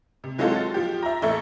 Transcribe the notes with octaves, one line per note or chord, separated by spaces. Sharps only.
C3
E3 F#3 G#3 C4 F4 A4
A6
F3 G4
E5 A#5
A1 A3 A4 E5